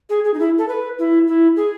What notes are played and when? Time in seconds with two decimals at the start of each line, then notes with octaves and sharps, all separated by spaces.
0.10 G#4
0.24 G#4
0.34 D#4
0.39 E4
0.58 A4
0.68 B4
0.99 E4
1.27 E4
1.56 G#4